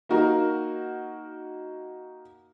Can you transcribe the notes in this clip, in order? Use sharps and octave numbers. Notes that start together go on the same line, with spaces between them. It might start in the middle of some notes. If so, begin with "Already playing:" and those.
A#3 D#4 F#4 A#4